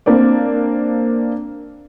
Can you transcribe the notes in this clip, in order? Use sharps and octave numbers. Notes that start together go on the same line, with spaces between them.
A#3 C4 D4 D5